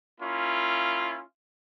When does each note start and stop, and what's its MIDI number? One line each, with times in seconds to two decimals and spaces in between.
0.20 1.22 58
0.20 1.22 61
0.20 1.22 64
0.20 1.22 65